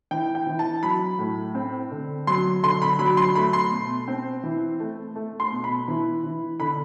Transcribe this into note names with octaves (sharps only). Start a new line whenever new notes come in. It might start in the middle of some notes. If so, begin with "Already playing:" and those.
E3 G5
G5
E3
A5
F#3 B5
A2
C4
D3
F#3 C6
D3 C6
B5
F#3 B5
C6
A3 B5
C6
B2
C4
E3
A3
A3
C6
B2
B5
E3
E3
D3 B5